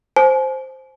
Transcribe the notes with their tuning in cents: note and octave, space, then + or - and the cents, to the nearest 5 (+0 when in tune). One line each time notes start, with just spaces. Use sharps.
C5 +0 G#5 +45